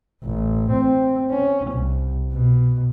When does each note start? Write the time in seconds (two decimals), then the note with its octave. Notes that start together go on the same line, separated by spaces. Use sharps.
0.23 A1
0.71 C4
1.31 C#4
1.71 C2
2.32 B2